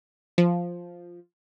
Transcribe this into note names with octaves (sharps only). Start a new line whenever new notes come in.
F3